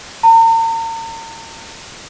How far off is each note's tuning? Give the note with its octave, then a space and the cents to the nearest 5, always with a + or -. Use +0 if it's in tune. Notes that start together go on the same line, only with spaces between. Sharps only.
A#5 -45